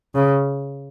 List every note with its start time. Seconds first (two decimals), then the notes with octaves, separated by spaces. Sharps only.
0.15 C#3